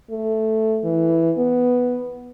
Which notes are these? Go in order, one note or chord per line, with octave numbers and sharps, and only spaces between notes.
A3
E3
B3